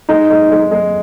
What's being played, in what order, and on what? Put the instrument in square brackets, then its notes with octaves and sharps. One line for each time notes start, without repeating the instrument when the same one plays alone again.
[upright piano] G#3 [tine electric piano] D#4
[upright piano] G#3
G#3
G#3